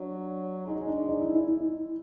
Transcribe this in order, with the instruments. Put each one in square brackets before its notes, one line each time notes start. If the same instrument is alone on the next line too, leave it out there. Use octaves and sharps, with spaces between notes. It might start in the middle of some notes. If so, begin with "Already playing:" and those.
Already playing: [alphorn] F#3 [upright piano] D4
[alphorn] G#3 [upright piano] D#4
[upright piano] D4
D#4
E4
E4
E4